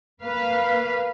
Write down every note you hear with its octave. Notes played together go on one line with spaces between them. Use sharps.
A#3 B4 F5